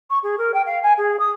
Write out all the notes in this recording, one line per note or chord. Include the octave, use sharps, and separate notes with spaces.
C#6
G#4
A#4
G5
F5
G#5
G#4
D#6